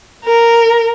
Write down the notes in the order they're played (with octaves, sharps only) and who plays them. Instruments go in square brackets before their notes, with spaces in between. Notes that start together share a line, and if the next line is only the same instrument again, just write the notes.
[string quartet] A#4